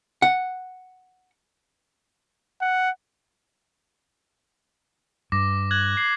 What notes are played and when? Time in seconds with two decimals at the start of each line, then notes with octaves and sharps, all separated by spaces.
0.22 F#5
2.61 F#5
5.32 G2 D6 A#6
5.71 F#6 G#6 F#7
5.97 C7 F#7